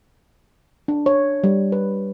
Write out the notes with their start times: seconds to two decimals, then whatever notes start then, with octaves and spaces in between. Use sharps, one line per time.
0.88 D4
1.06 C#5
1.44 G3
1.72 B4